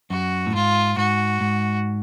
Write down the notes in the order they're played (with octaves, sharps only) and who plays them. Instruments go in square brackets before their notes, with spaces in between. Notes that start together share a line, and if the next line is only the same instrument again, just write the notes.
[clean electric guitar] F#2 [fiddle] F#4
[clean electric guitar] A2
[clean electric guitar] G#2 [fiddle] F4
[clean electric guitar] G#2 [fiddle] F#4
[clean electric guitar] G#2